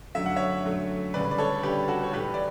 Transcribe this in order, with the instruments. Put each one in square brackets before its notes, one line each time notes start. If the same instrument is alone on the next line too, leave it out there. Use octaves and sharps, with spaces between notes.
[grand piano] F#2 D3 F#3 A3 E5
F#5
C#5 E5
F#2 D3 F#3 A3
D2 C#3 G3 B4 D5
D5
A4 C#5
D2 C#3 G3 G4 B4
F#4 A4
C#5
A2 E3 A3 G4 B4
D5